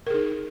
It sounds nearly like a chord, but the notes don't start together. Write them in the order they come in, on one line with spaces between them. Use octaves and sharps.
A#4 G#4 D#4